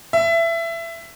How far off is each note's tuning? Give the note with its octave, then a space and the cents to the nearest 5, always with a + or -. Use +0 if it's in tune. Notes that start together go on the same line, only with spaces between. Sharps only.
E5 +20